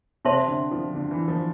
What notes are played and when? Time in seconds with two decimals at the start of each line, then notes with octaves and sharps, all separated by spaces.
0.25 C3 C5 E5 A5 C6
0.48 D3
0.71 F3
0.94 D3
1.11 E3
1.28 F3